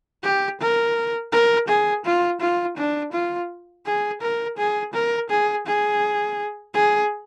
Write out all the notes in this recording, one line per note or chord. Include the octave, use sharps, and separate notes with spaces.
G4
A#4
A#4
G#4
F4
F4
D4
F4
G#4
A#4
G#4
A#4
G#4
G#4
G#4